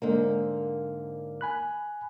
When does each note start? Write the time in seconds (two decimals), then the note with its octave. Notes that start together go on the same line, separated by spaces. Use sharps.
0.02 G#2 D3 A#3
1.41 G#5 B5 F#6